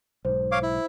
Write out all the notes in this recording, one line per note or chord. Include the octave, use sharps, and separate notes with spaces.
B1 G#2 C5
C#5 F5 D6
E4